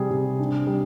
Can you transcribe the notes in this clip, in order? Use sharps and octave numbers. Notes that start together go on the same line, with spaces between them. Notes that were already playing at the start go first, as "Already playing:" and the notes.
Already playing: C3 G3 G#4
C3
D4
G3